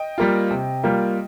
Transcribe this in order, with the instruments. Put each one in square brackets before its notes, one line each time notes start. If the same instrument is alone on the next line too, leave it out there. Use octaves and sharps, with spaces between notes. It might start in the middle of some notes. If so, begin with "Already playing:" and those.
Already playing: [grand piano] D#5 G5
G3 A#3 F4
C3
G3 A#3 F4